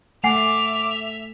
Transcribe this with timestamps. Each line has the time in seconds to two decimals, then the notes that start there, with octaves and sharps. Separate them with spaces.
0.24 A3 E5 F#5 G#5 D6 C7 F7